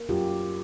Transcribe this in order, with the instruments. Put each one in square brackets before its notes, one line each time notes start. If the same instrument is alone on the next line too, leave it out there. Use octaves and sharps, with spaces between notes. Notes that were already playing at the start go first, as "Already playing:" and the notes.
Already playing: [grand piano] A#3
[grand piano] F#2 [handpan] F4 G4